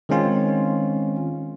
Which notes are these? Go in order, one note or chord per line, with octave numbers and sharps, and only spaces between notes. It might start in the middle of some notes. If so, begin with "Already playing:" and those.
D#3 G#3 C4 C#4 F4